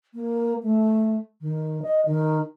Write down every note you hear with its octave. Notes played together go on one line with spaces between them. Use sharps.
A#3
A3
D#3
D#5
D#3